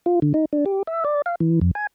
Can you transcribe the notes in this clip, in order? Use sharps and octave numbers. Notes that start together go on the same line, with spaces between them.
F4
D3
D#4
D4
G4
E5
D5
F5
E3
F2
G#5